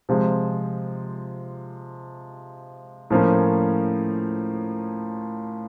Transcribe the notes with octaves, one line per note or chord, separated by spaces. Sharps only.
C3 F3 G#3
A2 F3 A#3 C#4